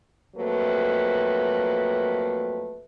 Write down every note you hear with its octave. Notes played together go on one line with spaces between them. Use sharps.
F2 F#3 A3 A#3 B4